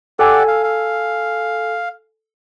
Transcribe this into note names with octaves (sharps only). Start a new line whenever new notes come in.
G4 A4 D5 F#5 G#5 E6
F5
F5